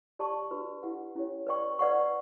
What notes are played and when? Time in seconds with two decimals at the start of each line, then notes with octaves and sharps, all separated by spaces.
0.19 G4 D5 A5 C#6
0.51 D4 F#4 B4
0.83 E4 G4 B4 F#5
1.15 C#4 E4 G4 C#5
1.47 B4 D5 G5 C#6
1.79 B4 D5 F#5 C#6